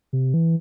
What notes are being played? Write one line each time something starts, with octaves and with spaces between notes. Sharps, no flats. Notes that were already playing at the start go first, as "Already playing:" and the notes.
C3
E3